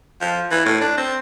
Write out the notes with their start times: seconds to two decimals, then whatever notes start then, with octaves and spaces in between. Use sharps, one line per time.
0.21 F3
0.51 E3
0.66 A2
0.82 D4
0.97 C4